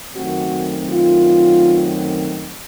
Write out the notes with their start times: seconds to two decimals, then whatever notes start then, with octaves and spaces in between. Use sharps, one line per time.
0.16 F#2 D#3 F#3 A3 C4 F#4
0.90 F4